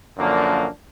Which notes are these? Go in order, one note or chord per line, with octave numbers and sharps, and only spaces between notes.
F#2 D3 F3 A#3 D4